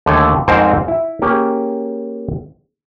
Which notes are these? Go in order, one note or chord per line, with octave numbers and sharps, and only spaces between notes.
D#2 D3 A3 A4 C#5 G#5
F2 G#2 C4 A#4 C5 A5
E4
A#3 C#4 G4 G#4